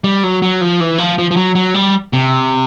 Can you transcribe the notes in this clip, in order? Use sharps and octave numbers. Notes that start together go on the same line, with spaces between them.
G3
F#3
F#3
F3
E3
F3
F3
F3
F#3
F#3
G3
C3